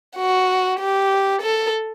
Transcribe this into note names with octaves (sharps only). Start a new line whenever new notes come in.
F#4
G4
A4